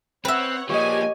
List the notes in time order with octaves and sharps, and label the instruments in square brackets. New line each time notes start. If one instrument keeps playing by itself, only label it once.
[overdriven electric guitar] C4 [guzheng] B4 E5 [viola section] C#5 F#5
[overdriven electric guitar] F3 A#3 [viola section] G4 G#5 [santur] C#5 D#5